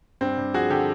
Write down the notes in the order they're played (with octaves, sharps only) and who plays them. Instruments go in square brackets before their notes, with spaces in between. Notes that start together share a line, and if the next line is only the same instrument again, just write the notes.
[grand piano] G2 C4
G2
F3 F#4 G#4
D3 G4 A4